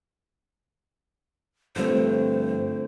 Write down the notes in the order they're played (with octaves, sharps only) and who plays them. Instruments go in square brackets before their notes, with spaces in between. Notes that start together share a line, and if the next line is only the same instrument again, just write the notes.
[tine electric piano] G2 F3 [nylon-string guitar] D3 A3 [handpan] C4 F4 [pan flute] C5